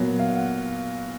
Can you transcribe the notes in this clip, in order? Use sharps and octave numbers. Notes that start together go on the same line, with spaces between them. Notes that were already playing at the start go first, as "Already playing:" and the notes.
Already playing: A#2 F#3 B3
F5
F#5